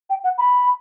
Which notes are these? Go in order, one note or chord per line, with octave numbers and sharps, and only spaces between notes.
G5
F#5
B5